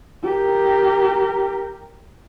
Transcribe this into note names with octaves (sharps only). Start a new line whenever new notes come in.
G4 A#4